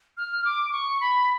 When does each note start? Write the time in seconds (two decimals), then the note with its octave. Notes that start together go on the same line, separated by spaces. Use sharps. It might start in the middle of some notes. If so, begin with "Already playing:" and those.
0.17 F6
0.45 D6
0.72 C#6
1.01 B5